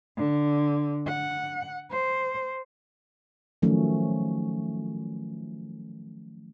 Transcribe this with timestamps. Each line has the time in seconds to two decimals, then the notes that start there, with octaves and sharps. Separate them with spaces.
0.17 D3
1.07 F#5
1.91 C5
3.62 D#3 F3 F#3 A3 C#4